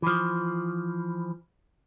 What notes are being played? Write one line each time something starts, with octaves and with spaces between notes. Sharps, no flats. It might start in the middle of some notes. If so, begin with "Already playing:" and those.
E3 F3